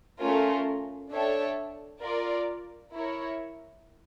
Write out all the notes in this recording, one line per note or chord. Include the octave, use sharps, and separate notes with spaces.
A3 C#4 F4 A#4
D4 A4 C#5 E5 G5
F4 A#4 D5
E4 A#4 C#5